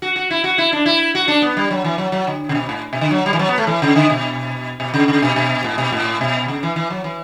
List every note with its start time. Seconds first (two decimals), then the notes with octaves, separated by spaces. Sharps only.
0.02 F#4
0.16 F#4
0.31 E4
0.44 F#4
0.58 E4
0.72 D4
0.86 E4
1.15 F#4
1.28 D4
1.42 B3
1.57 G3
1.71 F#3
1.84 E3
1.98 F#3
2.12 F#3
2.27 D3
2.49 C#3
2.55 B2
2.69 A2
2.93 B2
3.01 D3
3.11 F#3
3.26 G3
3.33 E3
3.39 F#3
3.48 B3
3.58 A3
3.67 E3
3.82 C#3
3.96 D3
4.10 B2
4.80 B2
4.94 C#3
5.08 C#3
5.22 B2
5.36 B2
5.64 A2
5.78 B2
5.92 A2
6.21 B2
6.48 C#3
6.63 E3
6.76 E3
6.90 F#3
7.04 E3